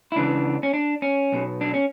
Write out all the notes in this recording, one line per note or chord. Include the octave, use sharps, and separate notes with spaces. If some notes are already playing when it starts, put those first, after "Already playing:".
E4
C#2 C#3 E3 D4
C#4
D4
C#4
B1 B2
D4
C#4